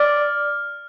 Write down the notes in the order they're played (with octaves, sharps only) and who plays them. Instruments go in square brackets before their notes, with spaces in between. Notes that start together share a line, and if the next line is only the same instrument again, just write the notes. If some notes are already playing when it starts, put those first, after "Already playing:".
Already playing: [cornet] D5 [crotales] F6